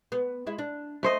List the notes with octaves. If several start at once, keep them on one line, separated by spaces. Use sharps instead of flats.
B3
G#3 E4
D4
A3 C5 D#5